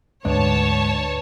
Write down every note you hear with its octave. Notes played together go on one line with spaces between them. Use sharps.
D2 G#2 D4 B4 C#5 A5